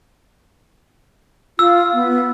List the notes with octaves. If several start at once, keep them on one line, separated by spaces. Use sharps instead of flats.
F4 E6
B3